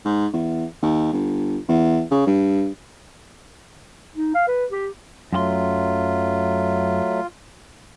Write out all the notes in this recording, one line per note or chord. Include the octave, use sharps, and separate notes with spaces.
G#2
E2
D#2
G1
E2
C#3
G2
D#4
F5
B4
G4
F#2 F#3 A3 F4 G4 C6